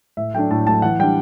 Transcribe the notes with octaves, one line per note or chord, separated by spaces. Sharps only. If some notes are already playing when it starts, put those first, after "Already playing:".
A2 E5
F#3 A3 D4 G5
A2 A5
F#3 A3 D4 A5
E3 F#5
G3 D4 G5